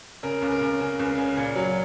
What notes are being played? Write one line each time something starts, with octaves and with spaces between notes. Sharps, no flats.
C#3 A#4
C#2
A#4
C#2
C#3
C#2
C#3
A#2
F#3